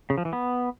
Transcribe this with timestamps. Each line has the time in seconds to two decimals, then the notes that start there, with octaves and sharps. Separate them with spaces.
0.10 C#3
0.18 F3
0.25 E3
0.33 B3